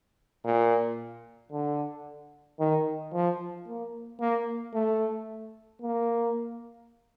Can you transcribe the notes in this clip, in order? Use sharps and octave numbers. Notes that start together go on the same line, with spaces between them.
A#2
D3
D#3
F3
A#3
A#3
A3
A#3